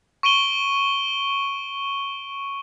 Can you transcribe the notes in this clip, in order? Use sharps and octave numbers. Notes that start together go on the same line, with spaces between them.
C#6 D7 D#7 G7